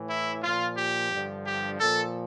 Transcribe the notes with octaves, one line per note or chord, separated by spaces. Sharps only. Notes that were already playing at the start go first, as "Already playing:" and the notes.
Already playing: A2 E3
E4
A#2 F3 F4
G4
G2 D3 F3
G4
A#2 F3 A4